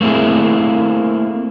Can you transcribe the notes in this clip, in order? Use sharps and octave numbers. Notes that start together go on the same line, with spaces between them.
A3 A#3 C4 E4 G#4